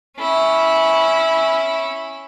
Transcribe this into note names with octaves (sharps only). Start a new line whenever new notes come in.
C#4 E4